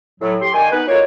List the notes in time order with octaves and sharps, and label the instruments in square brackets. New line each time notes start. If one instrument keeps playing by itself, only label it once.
[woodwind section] A2 F#3
G4 C6
D#3 A#3 D5 G5 G#5
B3 D#4 B4
A#3 D#4 F4 F#4 A4 C#5